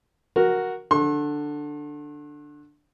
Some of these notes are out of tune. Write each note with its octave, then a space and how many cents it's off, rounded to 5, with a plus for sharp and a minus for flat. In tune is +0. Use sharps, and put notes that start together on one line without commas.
F#4 +0 A#4 +0
D3 +5 C6 +45